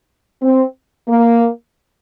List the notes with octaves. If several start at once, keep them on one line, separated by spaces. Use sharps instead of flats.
C4
A#3